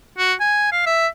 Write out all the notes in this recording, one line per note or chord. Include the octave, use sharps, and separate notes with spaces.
F#4
G#5
F5
E5